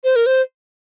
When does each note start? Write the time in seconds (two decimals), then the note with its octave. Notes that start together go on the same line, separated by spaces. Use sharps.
0.04 C5
0.16 A#4
0.26 C5